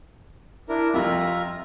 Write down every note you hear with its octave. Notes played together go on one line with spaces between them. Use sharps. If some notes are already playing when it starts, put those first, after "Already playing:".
D4 E4 A#4
C2 F2 F4 E5 A#5